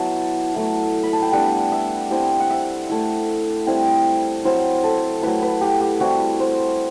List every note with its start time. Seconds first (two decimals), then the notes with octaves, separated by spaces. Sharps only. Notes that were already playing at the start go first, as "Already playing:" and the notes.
Already playing: F#3 B3 E4 A5
0.54 F#3 A3 E4
1.03 B5
1.13 A5
1.22 G5
1.32 G3 B3 D4 F#5
1.72 E5
2.11 G3 C4 E4 G5
2.40 F#5
2.50 E5
2.89 A3 E4
3.67 G3 C4 E4
4.45 F#3 C4 E4 C5
4.84 A4
5.23 F#3 A3 E4 B4
5.42 B4
5.61 G4
5.81 G4
6.00 G3 C4 E4 F#4
6.40 C5